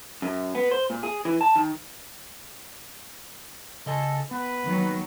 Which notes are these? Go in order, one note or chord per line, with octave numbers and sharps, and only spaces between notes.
F#2
B3
C5
A#2
G#4
E3
A5
D#3
C#3 A4 D#5 G#5
B3 B4
D#3 F#3 A#3